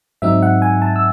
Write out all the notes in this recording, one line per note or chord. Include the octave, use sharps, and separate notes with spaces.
G#2 F#3 C4 D#4 E5
F#5
G#5
A5
E6